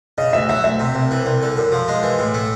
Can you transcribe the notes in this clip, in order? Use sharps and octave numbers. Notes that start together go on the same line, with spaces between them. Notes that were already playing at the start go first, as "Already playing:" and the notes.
C#3 D#5
D2 E5
F#3 E5
D2 E5
C3
C2
E3
C2
D3
F#2
F3
G#3
E3
A2
A3